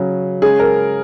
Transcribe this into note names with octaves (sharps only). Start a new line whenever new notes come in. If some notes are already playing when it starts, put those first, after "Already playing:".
Already playing: C#3 F#3
C#3 G#3 G#4
A#4